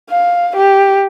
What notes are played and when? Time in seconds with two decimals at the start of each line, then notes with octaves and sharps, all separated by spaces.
0.10 F5
0.56 G4